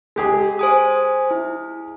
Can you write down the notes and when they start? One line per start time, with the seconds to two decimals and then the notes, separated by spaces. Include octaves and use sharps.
0.16 G#3 G4 G#4
0.59 C5 G#5 D#6
1.31 E4